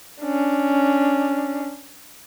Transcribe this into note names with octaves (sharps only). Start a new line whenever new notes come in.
C#4 D4